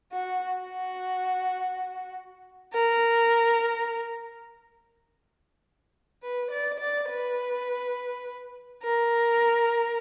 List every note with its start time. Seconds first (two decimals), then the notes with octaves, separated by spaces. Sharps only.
0.12 F#4
0.56 F#4
2.74 A#4
6.23 B4
6.51 D5
6.80 D5
7.10 B4
8.83 A#4